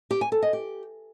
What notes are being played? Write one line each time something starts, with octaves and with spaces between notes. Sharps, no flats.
G4
G#5
A4
D#5
G4